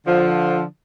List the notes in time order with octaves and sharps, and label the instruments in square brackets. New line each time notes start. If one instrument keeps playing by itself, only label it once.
[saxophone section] D3 F3